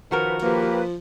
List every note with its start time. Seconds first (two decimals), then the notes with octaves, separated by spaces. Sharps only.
0.11 D#3 F3 F#4 A#4 B4
0.42 F3 A#3 G4 B4